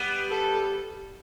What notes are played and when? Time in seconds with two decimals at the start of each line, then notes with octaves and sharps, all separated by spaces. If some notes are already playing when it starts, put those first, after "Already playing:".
Already playing: G3 B3
0.30 A4